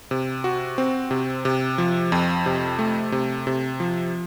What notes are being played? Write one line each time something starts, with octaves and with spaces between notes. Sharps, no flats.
C3
F#4
C4
C3
C3
F3
F2
C3
A3
C3
C3
F3